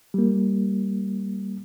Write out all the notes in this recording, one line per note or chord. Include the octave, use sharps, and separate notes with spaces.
G3 A#3